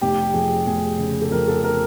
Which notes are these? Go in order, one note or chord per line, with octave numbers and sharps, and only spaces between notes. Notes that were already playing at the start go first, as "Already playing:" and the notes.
F1 G4
F2 G#4
F1 G#4
C#3
A4
F2 A#4
A4
A#4